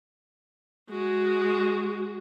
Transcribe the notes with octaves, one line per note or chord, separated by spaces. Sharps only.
G#3 F#4